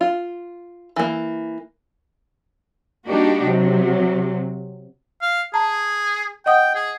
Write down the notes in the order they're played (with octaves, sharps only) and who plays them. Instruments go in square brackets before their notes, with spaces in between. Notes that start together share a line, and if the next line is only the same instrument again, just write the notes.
[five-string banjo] F4
E3 A#3
[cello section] G3 A#3 D4 D#4 F#4 G4
C3 F#3
[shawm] F5
[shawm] G#4 [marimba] A5 A#5
[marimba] D#5 F#5 D#6 [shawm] G5
[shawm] G#4